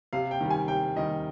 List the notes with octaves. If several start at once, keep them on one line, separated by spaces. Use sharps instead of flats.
C3 F5
G5
D#3 G3
G#5
C3 G5
D#3 G3 D#5